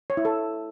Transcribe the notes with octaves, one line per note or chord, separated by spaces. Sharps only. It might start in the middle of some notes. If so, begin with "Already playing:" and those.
C#5
E4
A4